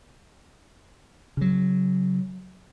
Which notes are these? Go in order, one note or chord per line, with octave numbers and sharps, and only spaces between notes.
C#3 F#3